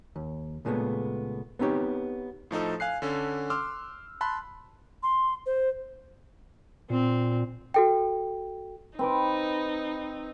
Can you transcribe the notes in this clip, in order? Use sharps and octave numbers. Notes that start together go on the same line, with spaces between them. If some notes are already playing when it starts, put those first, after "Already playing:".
D#2
C#2 A#2 G#3 A3 B3
B3 C4 D#4 G4 C#5
A2 F3 D#4 A4
F5 G#5 F#6 C7
D3 C#4 A4
C6 D6 E6 F6
A5 B5 C6 F#6
C6
C5
A#2 C4
F#4 A4 G5
C4 D#4 B4 D6